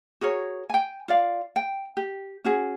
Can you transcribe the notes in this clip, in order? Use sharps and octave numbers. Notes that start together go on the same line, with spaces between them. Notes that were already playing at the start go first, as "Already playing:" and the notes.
F#4 G#4 A#4 C#5
G5 G#5
F4 D5 F5
G5
G4
C#4 F#4 G#4